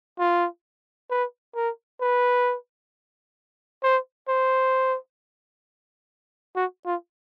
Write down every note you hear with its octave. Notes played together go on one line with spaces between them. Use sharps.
F4
B4
A#4
B4
C5
C5
F#4
F4